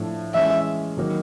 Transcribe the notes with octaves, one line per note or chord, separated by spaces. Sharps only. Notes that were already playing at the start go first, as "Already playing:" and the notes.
Already playing: A2 F3 A3 D4
E3 G#3 C#4 E5
D#3 F#3 A#3 D#4